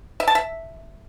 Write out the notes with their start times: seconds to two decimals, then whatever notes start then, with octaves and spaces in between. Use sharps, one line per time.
0.20 E5
0.28 A5
0.35 E5